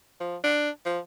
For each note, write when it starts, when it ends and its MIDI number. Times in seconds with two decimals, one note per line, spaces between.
0.20 0.36 53
0.44 0.70 62
0.85 0.99 53